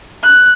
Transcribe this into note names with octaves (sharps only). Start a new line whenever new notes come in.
F#6